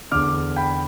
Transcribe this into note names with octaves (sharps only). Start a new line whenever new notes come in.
E2 D3 D6 F6
G5 B5